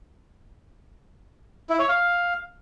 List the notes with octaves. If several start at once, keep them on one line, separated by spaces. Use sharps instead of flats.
E4
C#5
F5